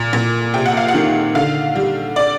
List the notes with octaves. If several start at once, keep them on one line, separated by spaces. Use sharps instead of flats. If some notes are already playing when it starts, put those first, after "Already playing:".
Already playing: A#2
A#2
C3 G5
F#5
F5
F#5
D#3
D3 F5
G3
D5